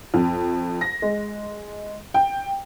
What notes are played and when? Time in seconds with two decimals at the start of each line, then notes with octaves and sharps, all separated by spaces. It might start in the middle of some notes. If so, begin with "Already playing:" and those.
0.14 F2
0.81 A#6
1.02 G#3
2.14 G5